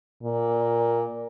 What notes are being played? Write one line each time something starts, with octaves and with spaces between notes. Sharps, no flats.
A#2